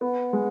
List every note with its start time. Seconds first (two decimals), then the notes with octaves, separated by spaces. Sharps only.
0.01 B3 F#5
0.33 G#3